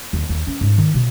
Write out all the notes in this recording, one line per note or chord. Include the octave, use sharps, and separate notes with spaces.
D#2
D#2
C#4
G#2
D#3
B2